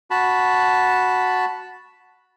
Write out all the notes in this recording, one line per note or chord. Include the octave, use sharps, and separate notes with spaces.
F#4 A5 B5